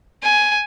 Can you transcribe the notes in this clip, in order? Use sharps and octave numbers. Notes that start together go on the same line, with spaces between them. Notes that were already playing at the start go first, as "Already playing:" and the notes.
G#5